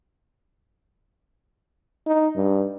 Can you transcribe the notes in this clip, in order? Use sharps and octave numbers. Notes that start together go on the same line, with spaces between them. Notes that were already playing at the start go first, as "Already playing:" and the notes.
D#4
G2